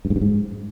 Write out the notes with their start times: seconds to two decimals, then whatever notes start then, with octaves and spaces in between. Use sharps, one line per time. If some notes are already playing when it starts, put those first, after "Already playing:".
0.05 G2
0.10 G#2
0.16 G2
0.21 G#2